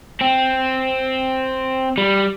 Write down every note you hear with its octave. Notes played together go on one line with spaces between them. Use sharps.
C4
G3